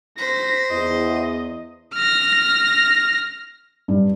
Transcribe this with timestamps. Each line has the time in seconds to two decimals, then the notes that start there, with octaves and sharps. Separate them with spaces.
0.18 C5 A#6 B6
0.71 E2 D#5
1.95 F6 A#6
3.88 G2